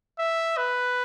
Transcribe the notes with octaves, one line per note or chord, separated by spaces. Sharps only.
E5
B4